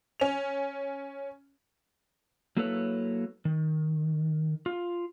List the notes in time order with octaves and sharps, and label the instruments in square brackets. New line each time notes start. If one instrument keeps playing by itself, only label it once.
[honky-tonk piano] C#4 F7
[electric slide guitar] F#3 A#3 E4 A4 B4 C#5
D#3
F4